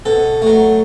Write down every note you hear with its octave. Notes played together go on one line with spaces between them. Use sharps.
B2 A4
F#3 A3